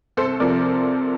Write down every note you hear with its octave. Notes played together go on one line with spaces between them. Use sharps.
C2 A4 C5
C3 F3 C4 A#4 D5